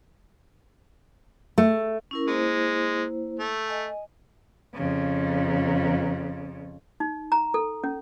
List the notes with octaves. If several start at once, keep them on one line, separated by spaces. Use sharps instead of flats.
A3
C#4 E4 A#4
G#3 A#3 E4 C5
A3
D#5 G#5
F2 C#3
D#4
A#5
A4
C#4